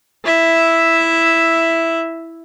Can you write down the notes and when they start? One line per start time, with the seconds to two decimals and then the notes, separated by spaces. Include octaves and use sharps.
0.25 E4 E5